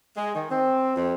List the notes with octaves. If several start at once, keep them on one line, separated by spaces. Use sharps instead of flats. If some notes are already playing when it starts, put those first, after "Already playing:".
G#3
D#3
C4
F2